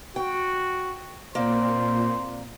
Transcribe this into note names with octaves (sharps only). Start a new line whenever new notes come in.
F#4 G5
A#2 A#3 C4 C5 D5